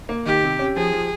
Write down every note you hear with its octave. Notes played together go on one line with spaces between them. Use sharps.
A#3
D#3 G4
C3
C#4
F3 G#4
F3